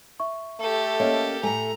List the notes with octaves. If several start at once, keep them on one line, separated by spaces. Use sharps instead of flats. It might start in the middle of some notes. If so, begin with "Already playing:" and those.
E5 C#6
A3 G4 A4
A#3 C#4 C#5 D#5
A2 A3 G#5 A#5